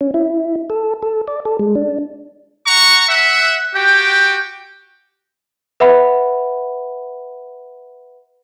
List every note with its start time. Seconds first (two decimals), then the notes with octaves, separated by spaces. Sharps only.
0.01 C#4
0.14 E4
0.70 A4
1.02 A4
1.28 D5
1.45 A4
1.59 G#3
1.75 D4
2.66 F#5 A#5 C#6
3.09 E5 F#5
3.75 F#4 G4 G5
5.80 B4 E5 F#5 B5